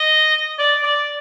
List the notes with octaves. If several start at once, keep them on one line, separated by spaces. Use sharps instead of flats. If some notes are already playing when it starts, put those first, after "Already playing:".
Already playing: D#5
D5
D5